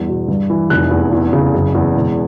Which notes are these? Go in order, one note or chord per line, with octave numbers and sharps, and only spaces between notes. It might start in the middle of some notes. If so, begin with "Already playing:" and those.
Already playing: E2 G2
B2
G2
E3
F1 F#6
E2
E2
C#3
F#1
E2
E1